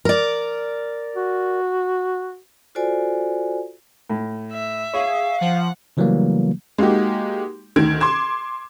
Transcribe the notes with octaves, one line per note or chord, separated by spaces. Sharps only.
A#4 D5
F#4
F4 F#4 A4 C5 D5 G#5
A2
E5
G#4 C#5 F5
F3 F#5
C#3 E3 F#3 G3 A3 A#3
G#3 A#3 D#4 F#4 G4
D2 D#3 G#6 D7
C6 D6 G#6 E7